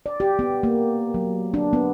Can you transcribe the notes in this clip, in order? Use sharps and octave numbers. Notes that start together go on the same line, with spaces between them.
D5
G4
B3
A#3
F#3
D4
B3